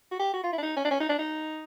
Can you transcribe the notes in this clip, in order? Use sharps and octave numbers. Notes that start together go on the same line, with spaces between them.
F#4
G4
F#4
F4
E4
D4
D#4
C#4
D4
C#4
D#4
D4
D#4